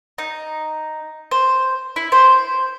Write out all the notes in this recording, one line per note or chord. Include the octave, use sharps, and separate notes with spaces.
D#4
C5
E4
C5